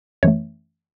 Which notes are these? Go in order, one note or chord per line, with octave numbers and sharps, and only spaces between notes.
F#2 E3 A3 C#5